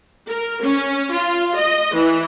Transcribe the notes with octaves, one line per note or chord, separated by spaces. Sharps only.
A#4
C#4
F4
D#5
E3